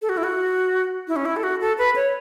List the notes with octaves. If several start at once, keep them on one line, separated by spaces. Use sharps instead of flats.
A4
F#4
E4
F#4
E4
C#4
E4
A4
F#4
A4
B4
C#5